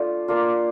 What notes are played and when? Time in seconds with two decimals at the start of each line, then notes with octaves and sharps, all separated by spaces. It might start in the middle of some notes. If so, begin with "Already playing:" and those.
Already playing: A3 D4 F4
0.28 A#3 D4 F4